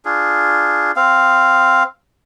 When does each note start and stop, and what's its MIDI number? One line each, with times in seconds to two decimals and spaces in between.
0.05 0.92 62
0.05 0.92 65
0.05 0.92 68
0.96 1.83 60
0.96 1.83 77